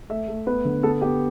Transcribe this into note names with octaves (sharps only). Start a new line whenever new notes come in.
A3 E5
A3
B3 B4
D3
B3 A4
B3 G4